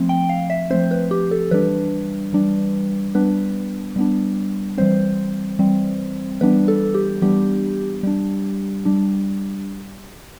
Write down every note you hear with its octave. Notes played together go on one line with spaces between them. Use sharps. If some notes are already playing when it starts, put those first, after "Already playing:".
Already playing: F3 A3 C4
G5
F5
E5
F3 A3 C4 C5
B4
G4
A4
E3 G3 D4 B4
E3 G3 D4
G3 B3 D4 B4
G3 B3 D4
E3 G3 C4 C5
E3 G3 C4
E3 G3 B3 D4 B4
A4
G4
E3 G3 B3 D4 G4
G3 D4
G3 D4